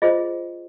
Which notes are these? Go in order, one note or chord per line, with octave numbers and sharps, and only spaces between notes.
F4 G#4 C5 D#5